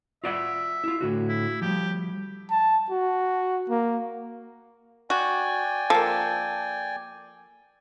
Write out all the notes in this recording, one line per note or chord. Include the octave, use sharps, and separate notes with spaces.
F4 D5 E5 F#5
E4 F4
A2 D3 F#4
E4
F3 G3 G4
A5
F#4
A#3
F#4 D5 G5 G#5
F3 A#3 A4